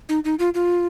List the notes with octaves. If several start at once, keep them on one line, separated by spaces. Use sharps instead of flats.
D#4
D#4
F4
F4